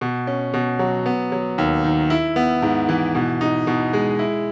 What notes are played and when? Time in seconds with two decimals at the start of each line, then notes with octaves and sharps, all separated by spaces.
0.01 B2
0.27 C#4
0.54 B2
0.79 F#3
1.06 B3
1.32 F#3
1.58 D#2
1.84 D#3
2.10 E4
2.36 B3
2.62 G#2
2.89 E3
3.15 B2
3.41 D#4
3.67 B2
3.93 G#3
4.19 E4